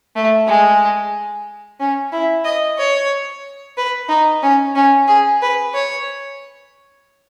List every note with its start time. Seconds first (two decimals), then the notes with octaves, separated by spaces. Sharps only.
0.16 A3
0.47 G#3
1.80 C#4
2.12 E4
2.45 D#5
2.79 C#5
3.77 B4
4.09 D#4
4.42 C#4
4.75 C#4
5.08 G#4
5.42 B4
5.74 C#5